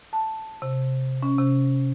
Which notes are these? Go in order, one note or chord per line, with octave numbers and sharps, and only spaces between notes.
A5
C3
C#4
C3